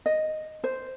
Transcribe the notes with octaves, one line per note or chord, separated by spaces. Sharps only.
D#5
C5